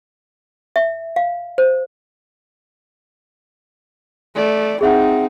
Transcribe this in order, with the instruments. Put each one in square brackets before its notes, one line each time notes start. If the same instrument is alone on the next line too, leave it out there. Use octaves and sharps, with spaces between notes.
[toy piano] E5
F5
C5
[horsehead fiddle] A3 D5
[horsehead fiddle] C4 D#4 [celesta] G#4 E5 F#5